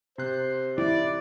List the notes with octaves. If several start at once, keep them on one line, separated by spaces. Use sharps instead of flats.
C3 C5 F#6
E4 D5